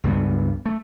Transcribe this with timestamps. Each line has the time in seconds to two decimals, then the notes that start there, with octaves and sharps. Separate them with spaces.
0.04 C#2 G2 G3 B3
0.66 A3